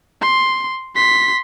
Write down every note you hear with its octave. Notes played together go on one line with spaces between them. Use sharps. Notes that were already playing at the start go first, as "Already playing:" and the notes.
C6
C6 B6